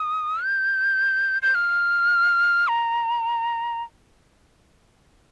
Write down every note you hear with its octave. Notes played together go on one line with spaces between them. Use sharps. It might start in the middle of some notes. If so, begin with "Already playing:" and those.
Already playing: D#6
G6
G6
F6
A#5